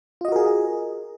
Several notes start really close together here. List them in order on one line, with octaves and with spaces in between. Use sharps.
F4 D#5 F#4 A#4 G#4